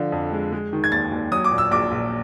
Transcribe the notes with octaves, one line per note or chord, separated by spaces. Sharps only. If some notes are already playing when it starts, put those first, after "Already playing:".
Already playing: D3 F3
F2
G#3
G#3
D#3
G#6
D#2 A6
D#2
F#3 D#6
D6
A#2
E6
A#1 D6
A#1